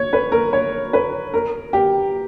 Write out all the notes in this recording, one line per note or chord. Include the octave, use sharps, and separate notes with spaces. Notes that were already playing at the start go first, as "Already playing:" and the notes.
Already playing: C#5
B4
A#4
C#5
B4
A#4
G4